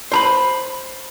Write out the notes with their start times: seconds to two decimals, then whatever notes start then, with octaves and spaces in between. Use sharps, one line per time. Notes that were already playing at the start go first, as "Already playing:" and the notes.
0.12 C5 A#5 B5